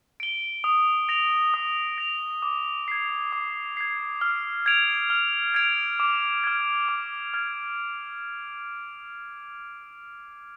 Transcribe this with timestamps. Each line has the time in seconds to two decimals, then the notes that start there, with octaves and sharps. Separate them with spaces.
0.20 D7 G7
0.64 D#6
1.09 A#6 D7 F7
1.54 D#6
1.98 A#6 D7 F7
2.42 D6
2.88 G#6 C7
3.32 D6
3.77 G#6 C7
4.21 F6
4.66 G#6 D7 F7
5.10 F6
5.54 G#6 D7 F7
6.00 D6
6.44 F6 G#6
6.88 D6
7.34 F6 G#6